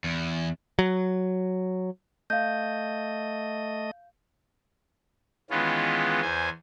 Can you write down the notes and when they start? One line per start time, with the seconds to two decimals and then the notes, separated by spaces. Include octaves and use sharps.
0.04 E2
0.79 F#3
2.30 A3 D#5 F5 G6
5.50 D#3 E3 G#3 B3 C#4 F4
6.22 E2 C5 G#5